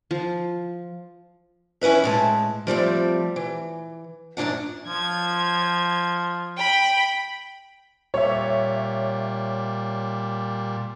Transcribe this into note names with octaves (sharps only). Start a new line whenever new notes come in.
F3
E3 C#4 E4 B4 E5
A2 G#3 A5
F3 G3 A3 C4
E3
F#2 A2 D3 D4 F#5
F3 G#6
G5 B5
A#2 G3 C#5 E5